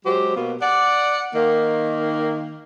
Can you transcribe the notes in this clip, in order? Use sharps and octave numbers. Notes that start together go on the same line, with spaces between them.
F#3 G#3 G4 C5
B2 A#3 B3 F#4
D5 F#5
D#3 A#3